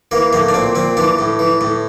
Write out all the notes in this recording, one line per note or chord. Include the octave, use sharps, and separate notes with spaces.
E3 A#3
A2 A#3
D4
A#2 C4
A#2 C4
E3 D4
A2
E3
A2